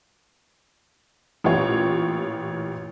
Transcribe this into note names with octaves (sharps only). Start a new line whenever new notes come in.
A1 A#2 F4 G4 C#5